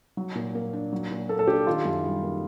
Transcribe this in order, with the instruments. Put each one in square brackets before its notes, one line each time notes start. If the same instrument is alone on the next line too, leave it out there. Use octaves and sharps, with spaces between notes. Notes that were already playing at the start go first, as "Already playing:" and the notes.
[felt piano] F#3
A#2
A#3
D4
F#3
A#2
[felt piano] A#3 [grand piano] A4
[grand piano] A4
[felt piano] D4 [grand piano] G4
[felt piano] D#3 [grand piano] F4
[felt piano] F#2
G3
A#3